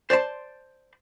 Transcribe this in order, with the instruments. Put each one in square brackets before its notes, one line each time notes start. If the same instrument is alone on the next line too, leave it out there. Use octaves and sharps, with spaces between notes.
[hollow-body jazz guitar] C5 D5 A5 C6